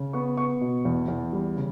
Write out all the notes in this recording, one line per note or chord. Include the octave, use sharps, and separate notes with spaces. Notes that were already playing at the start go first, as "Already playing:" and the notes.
Already playing: C#3
B3 C#6
B3 C#6
B2
E2
E2
G3
C#3